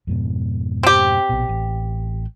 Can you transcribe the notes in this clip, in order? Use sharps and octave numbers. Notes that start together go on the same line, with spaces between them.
F2 G#2 B2
C4 G4
A#1 B2
A1